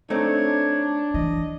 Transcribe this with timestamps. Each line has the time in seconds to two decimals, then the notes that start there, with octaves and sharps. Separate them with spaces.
0.10 A3 C4 D4 D#4 C#5
1.14 E3 D#5